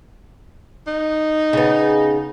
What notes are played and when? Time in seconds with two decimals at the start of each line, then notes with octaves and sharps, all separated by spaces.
0.87 D#4
1.53 C#3 B3